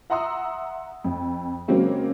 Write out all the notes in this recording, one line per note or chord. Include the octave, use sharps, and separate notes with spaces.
E5 F#5 A#5 C6 D#6 E6
F2
C#3 F#3 G#3 A#3 C4 C#4